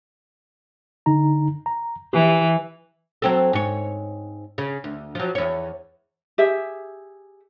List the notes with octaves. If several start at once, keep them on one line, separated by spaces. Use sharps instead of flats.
D3 D#4 A#5
A#5
E3 G4
F#3 C4 A4
G#2 C#5
C#3
D2
F3 F#3
E2 C#5
G4 G#4 E5